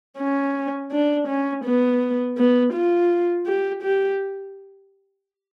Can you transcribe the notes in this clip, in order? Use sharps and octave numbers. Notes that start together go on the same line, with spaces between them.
C#4
D4
C#4
B3
B3
F4
G4
G4